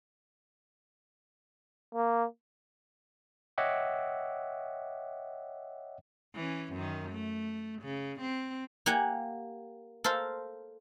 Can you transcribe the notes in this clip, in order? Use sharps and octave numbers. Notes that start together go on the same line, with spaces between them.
A#3
C#5 D#5 E5 F#5 G5 D6
E3 C#4
F#2 D#3
A3
C#3
C4
A#3 G4 F#5 G#5
A4 A#4 C5 F5